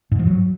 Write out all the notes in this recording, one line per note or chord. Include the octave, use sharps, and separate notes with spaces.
G#2
F3
F#3